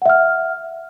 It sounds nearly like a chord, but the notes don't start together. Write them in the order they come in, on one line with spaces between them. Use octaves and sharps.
F#5 E5 F6